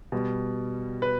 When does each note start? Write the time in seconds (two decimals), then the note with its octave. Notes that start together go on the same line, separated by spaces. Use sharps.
0.12 B2 G3
1.02 B4